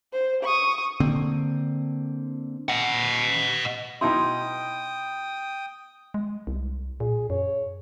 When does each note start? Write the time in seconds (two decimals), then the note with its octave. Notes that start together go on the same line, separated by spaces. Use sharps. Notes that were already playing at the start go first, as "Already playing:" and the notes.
0.13 C5
0.43 C#6 D#6
1.00 D3 A#3 C4
2.69 D#5 F#5
4.01 B2 D#4 E4 G5 C6 D#6
6.14 G#3
6.47 C2
7.00 A#2 G#4
7.30 F#2 C#5